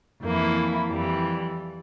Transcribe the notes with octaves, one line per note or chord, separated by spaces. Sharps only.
F2 E3 A#3 E4
F2 E3 G3